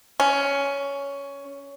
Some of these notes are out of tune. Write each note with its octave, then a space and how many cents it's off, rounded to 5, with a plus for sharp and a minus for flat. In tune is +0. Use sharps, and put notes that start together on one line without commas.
C#4 +10